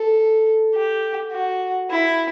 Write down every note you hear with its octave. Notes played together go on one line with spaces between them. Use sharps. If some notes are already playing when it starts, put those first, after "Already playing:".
Already playing: A4
G4
F#4
E4